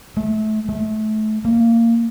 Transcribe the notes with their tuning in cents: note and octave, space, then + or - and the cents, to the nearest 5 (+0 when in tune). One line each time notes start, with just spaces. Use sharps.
A3 -25
A3 -25
A#3 -15